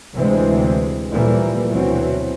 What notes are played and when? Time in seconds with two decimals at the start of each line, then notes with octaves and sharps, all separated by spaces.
0.15 D2 C3 E3 G#3 C4
1.11 A#2 E3 F3 G3 A3 A#3
1.71 D2 B2 E3 F#3 C4